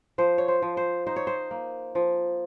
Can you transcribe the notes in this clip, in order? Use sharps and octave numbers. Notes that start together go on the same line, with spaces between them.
F3 C5
C#5
C5
F3
C5
D#4 C5
C#5
C5
A#3
F3